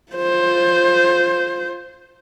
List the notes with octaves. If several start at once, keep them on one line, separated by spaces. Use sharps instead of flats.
F4 C5